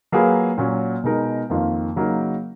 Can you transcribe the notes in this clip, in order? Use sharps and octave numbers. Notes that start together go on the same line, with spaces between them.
F#3 A#3 F4 G#4 B4
A#2 F#3 C#4
B2 G#3 D#4 A#4
F2 D#3 A#3 F4
C#3 F#3 A#3 D#4 A#4